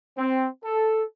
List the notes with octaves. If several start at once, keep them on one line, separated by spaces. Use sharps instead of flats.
C4
A4